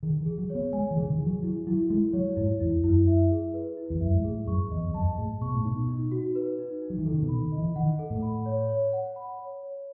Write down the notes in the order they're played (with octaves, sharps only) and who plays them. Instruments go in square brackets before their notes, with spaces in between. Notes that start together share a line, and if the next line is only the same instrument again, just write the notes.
[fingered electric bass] D#3 [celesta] G#4
[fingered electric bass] E3
[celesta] G#4
[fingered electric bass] F#3
[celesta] C#5
[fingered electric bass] B3
[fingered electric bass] G#3 [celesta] G#5
[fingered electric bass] E3
[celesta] G#4
[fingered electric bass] C#3
D#3
[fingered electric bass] E3 [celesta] G#4
[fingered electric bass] F#3
[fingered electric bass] F#3 [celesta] E4
[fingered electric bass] F#3 [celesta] E4
[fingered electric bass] G#3 [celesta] A4
[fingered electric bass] F#3 [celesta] C#5
[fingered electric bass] G#2 [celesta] E4
[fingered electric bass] E2 [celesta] E4
[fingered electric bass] F#2 [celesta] E4
[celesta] E5
G#4
B4
E4
[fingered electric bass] E2
[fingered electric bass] F#2 [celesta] E5
[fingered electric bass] G#2
[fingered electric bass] A2 [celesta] G#4
[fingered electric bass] F#2 [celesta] C#6
[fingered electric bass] E2 [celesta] D#5
[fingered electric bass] E2
[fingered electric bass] F#2 [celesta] A5
[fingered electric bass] A2 [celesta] G#4
[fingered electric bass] B2 [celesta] C#6
[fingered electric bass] A2
[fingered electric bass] B2 [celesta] D#4
[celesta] D#4
F#4
B4
D#4
D#4
[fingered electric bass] F#3
E3
[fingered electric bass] D#3 [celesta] A4
[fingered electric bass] C#3
B2
[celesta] B5
[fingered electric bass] D#3
[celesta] D#5
[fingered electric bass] E3
[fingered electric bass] D#3 [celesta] F#5
[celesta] A4
[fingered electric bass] A2
[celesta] B5
C#5
C#5
F#5
B5
C#5
C#5